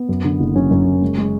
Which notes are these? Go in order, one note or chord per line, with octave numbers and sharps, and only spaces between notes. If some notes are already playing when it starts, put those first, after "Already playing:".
Already playing: B3
F#2
D3
F#1
F#2 C#4
F#2
F#1
G#3
G#3